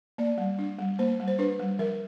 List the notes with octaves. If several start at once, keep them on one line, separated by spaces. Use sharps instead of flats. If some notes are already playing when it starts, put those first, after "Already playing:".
A#3 D5
G3
D4
G3
A#3 C5
G3
C5
D4 B4
G3
F3 A#4